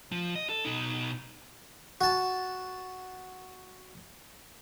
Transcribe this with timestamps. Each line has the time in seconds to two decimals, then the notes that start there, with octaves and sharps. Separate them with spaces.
0.12 F3
0.35 D#5
0.49 A4
0.65 B2 D#4
2.01 F#4 A5